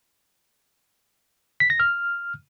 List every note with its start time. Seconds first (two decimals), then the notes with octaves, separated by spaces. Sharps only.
1.60 B6
1.70 A#6
1.80 F6